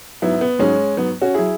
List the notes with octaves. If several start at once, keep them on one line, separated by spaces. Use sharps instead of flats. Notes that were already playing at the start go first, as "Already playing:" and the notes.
G#2 F#3 B3 E4
B3
G#2 F#3 G#3 C#4
G#2 F#3 B3
C#4 F#4
F#3 E4 G#4